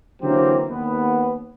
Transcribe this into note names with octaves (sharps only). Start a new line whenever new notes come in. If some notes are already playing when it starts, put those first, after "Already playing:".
D3 E3 F#3 A#3 C4 G4
D#2 B3